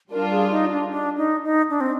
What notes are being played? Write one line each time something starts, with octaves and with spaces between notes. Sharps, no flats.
G3 D4 F4 A#4
G#4
D#4
D4
D4
D#4
D#4
D4
C4